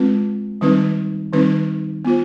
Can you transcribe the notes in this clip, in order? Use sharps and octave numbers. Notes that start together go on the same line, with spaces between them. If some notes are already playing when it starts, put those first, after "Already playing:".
Already playing: G#3 C4 F4 B4
D#3 G3 C4 D#4 B4
D#3 G3 C4 D#4 B4
B3 F4 C5